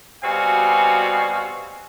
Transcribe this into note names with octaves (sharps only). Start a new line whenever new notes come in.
B2 G3 C4 F#4 F5 G#5